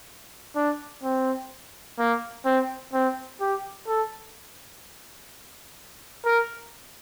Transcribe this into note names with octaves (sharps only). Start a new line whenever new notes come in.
D4
C4
A#3
C4
C4
G4
A4
A#4